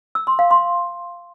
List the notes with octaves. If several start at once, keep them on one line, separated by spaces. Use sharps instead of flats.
E6
C6
F5
C6